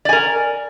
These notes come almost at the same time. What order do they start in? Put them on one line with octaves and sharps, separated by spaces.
D5 G#5 A#4